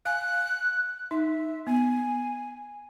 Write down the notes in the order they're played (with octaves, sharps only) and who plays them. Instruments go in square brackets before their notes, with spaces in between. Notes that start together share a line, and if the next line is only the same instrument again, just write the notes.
[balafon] F5 G#5 [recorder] F#6
[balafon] D#4 [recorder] E5
[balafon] B3 [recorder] G#5